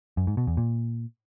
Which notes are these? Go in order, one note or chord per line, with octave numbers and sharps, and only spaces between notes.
F#2
G#2
B2
E2
A#2